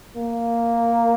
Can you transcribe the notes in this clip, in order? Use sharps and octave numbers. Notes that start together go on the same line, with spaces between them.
A#3